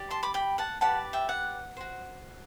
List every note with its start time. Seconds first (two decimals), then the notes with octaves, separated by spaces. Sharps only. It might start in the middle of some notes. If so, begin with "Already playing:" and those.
Already playing: G4 D5
0.10 A5 C6
0.23 B5 D6
0.34 G5 B5
0.58 F#5 A5
0.81 G4 B4 D5 F#5 A5
1.13 E5 G5
1.29 F#5
1.77 F#4 C5